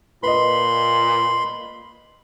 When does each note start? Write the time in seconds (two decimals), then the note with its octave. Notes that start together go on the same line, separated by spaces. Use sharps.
0.23 A#2 B4 D#5 B5 C6